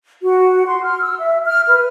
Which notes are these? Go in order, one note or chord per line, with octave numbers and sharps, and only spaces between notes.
F#4
C6
F6
E6
E5
F6
B4